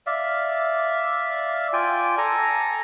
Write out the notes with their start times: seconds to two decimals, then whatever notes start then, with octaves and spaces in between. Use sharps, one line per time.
0.06 D5 E5 F5
1.73 F4 D5 G5 G#5
2.18 A4 G#5 A#5